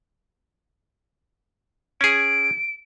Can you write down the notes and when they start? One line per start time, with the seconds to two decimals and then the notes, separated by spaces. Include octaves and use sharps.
2.01 C#4 G#4 D7